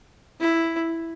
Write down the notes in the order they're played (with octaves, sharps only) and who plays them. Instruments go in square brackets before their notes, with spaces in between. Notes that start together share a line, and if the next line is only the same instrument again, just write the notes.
[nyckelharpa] E4